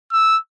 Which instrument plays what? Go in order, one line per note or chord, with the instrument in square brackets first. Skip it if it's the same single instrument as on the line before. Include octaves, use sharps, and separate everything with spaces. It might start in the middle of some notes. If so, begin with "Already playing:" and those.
[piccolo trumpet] E6